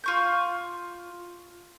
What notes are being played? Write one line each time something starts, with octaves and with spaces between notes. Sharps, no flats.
F4 C#6 G6